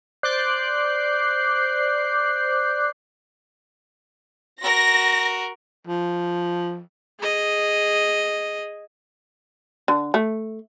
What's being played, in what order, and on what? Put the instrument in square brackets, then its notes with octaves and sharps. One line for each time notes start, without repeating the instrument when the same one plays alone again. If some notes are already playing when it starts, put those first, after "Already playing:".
[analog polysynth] C5 D5 D6 F#6 G6 C7
[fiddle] F#4 A#4 [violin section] A#6
[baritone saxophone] F3
[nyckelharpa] G#4 D#5
[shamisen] D3
A3